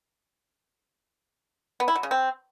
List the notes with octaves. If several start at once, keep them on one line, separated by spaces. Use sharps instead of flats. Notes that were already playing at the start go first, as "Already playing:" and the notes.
B3
E4
F#3
C#3
C4